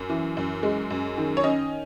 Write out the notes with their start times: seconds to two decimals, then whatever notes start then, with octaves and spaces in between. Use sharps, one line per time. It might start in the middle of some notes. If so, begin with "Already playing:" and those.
Already playing: F#2
0.09 E3
0.37 F#2
0.63 G#3
0.90 F#2
1.18 D#3
1.37 C#5
1.44 C#4 D#5